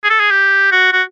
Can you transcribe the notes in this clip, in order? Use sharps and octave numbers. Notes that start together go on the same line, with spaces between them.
G#4
A4
G#4
G4
F#4
F#4